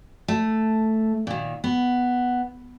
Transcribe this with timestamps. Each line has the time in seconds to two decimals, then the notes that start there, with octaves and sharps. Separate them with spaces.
0.28 A3
1.27 A#2 D#3
1.64 B3